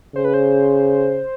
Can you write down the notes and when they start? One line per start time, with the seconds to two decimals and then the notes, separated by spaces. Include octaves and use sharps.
0.15 C#3 C5
0.25 B4
0.34 C5